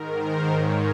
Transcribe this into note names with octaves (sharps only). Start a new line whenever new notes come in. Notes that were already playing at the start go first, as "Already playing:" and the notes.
Already playing: G#2 D#3 A#4
C5
G#2 D#3 C#5